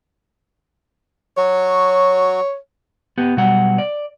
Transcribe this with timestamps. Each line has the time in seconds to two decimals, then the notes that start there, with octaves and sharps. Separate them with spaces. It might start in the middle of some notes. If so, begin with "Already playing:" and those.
1.37 F#3 F#4 C#5
3.18 B3 G4
3.37 B2 F#3 G3 F#5
3.78 D5